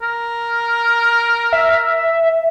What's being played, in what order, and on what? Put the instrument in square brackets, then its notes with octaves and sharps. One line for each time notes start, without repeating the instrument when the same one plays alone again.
[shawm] A#4
[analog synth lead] E5